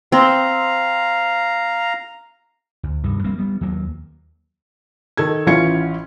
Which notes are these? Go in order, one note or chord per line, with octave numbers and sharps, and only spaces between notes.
C4 F5 A#5
D2
G2 C3 D#3
G3 A#3 C4
G3 B3
D#2 F#3 A#3
D#3 A4 G#6
A1 E3 C#4 F4 G#6 C#7